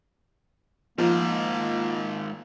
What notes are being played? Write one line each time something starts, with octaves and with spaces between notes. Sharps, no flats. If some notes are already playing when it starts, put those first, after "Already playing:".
G#2 D#3 F3 A#3